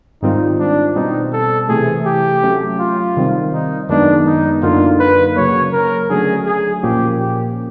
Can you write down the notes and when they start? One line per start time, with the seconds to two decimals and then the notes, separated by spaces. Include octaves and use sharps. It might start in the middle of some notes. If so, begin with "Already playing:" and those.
0.23 G#2 D#3 G3 C4 D#4 F4
0.59 D4
0.96 B2 G3 C4 D#4
1.33 A4
1.69 C3 E3 A3 G#4
2.06 G4
2.43 F#3 A3 C#4
2.79 F4
3.17 C3 D#3 G3 C4
3.53 D#4
3.89 F#2 D#3 G#3 B3 D4 D#4
4.26 D#4
4.63 F#2 D3 F#3 A#3 D#4 F4
5.00 B4
5.36 C#3 F#3 A#3 C#5
5.72 A#4
6.10 D3 F#3 A3 C#4 G#4
6.46 G#4
6.83 A#2 F3 A#3 C#4 G4
7.20 G4